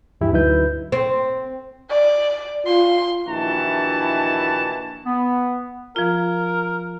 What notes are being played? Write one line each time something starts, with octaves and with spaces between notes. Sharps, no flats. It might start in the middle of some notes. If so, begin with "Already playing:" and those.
D2 G2 E3 E4 G4
D2 F#3 D#4 E4 B4 G6
C4
D5
F4 C6
A#1 D#3 E3 E4 F#4 A5
B3
F3 F4 A#4